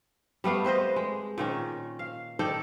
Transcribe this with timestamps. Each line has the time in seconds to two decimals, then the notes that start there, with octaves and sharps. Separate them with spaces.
0.44 G3 A3 B3 F5
0.65 C4 B4 C5 D#5
0.96 G#3
1.38 A#2 D#3 C#4
1.99 F5
2.39 D#3 A4 D5 G5